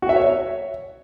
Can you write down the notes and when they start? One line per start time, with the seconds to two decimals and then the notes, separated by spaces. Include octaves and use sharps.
0.02 F#4
0.09 E5
0.16 C#5